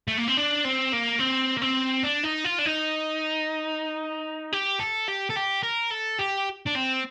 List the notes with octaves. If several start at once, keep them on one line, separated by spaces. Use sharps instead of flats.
A3
A#3
C4
D4
C4
A#3
C4
A#3
C4
D4
D#4
F4
D4
D#4
G4
A4
G4
A4
G4
A#4
A4
G4
D4
C4